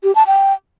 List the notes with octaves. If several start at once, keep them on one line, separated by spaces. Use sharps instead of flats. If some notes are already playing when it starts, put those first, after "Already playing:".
G4
A5
G5